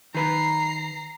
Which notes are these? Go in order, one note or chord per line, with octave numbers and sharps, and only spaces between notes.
D#3 B4 A#5 C7